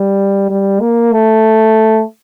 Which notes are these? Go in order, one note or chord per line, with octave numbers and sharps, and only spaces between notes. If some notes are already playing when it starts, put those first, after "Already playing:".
Already playing: G3
G3
A#3
A3